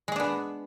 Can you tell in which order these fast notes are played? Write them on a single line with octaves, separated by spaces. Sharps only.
G#3 G#4 D4 B3